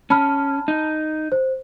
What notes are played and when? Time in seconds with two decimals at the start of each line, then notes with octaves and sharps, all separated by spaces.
0.10 C#4 A5 B5 F6
0.68 D#4
1.32 C5